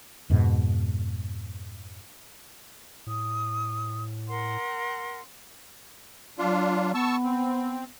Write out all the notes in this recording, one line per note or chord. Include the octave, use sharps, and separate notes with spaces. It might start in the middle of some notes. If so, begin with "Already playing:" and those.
F2 G#2 B2
A2 D#6
A#4 F#5 C6
F#3 D4 F4
B3 A5 C#6 E6
C4